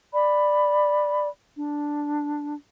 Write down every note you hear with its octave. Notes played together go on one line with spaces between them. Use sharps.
D5 B5
D4